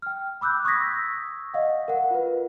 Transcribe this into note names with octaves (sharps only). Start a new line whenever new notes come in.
G5 F6
B5 D6 E6 F#6 G6
C#6 D#6 E6 G#6 A#6 B6
D#5 F5 F#5
A#4 F#5
F4 B4